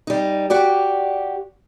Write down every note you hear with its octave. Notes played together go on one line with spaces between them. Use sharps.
G3 D#4
F#4 G4 D5